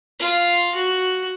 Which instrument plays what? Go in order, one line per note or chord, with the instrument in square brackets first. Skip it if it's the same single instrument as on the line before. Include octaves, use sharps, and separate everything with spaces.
[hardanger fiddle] F4
F#4